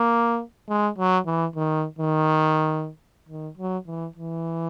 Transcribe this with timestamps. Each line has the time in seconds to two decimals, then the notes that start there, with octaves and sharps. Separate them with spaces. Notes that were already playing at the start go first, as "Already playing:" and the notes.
Already playing: A#3
0.69 G#3
0.98 F#3
1.26 E3
1.55 D#3
1.99 D#3
3.29 D#3
3.57 F#3
3.87 E3
4.16 E3